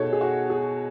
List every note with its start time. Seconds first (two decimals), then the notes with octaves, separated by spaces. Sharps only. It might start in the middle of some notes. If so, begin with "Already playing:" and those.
Already playing: B2 D#4 G#4 A4 C#5
0.13 G#4
0.21 F#4
0.50 G#4